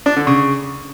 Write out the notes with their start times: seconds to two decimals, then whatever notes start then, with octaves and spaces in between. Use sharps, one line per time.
0.06 D4
0.16 D3
0.27 C#3